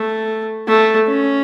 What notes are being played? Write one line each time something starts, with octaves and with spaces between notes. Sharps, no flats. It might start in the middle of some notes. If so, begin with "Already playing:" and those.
Already playing: A3
A3
C#4